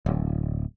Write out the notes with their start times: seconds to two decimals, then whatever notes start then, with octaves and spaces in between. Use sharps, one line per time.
0.06 D1